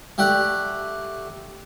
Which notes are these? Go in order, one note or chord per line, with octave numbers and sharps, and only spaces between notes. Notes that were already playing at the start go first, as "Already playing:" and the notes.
A3 G4 D5 F#5